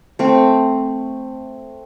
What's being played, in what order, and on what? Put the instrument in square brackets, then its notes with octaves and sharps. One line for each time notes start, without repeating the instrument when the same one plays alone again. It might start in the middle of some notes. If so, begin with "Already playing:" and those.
[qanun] A3 C4